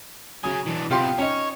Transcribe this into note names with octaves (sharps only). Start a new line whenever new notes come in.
C#3 F#3 G#5 D#6
E3 D4
C3 B3 F4 G4 C6
C#4 D#4 C#5